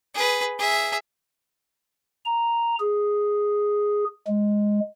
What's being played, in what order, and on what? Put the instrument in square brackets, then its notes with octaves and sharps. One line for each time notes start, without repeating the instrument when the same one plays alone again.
[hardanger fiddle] G#4 B4
G#4 E5
[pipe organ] A#5
G#4
G#3